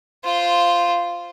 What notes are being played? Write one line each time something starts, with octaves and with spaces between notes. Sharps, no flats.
F4 C5